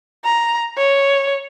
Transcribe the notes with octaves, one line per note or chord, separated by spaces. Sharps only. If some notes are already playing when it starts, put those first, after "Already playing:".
A#5
C#5